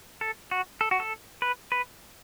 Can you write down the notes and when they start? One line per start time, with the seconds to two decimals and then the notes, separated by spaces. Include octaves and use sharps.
0.21 A4
0.51 F#4
0.81 A4
0.91 F#4
1.00 A4
1.42 B4
1.72 B4